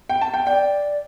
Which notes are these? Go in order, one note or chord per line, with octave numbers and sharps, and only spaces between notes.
G5
A5
G5
D5 G5